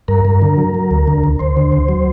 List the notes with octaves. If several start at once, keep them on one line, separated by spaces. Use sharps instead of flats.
G2 A#4
G2
D3
F#3
F#3
D2
D3
D2
D2 C5
D3
D2
F#3